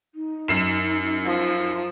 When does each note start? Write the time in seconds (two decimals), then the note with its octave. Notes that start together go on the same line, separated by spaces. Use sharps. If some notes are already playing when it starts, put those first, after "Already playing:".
0.14 D#4
0.48 F#2 C7 E7
1.25 F3